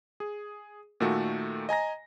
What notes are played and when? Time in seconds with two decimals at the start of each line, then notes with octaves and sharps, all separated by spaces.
0.20 G#4
1.00 A#2 D#3 A3 F#4 A4
1.69 D#5 G#5 A#5 A#6